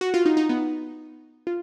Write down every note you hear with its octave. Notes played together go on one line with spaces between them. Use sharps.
F#4
F4
D#4
D#4
B3
F4